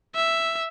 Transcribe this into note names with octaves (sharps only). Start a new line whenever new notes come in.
E5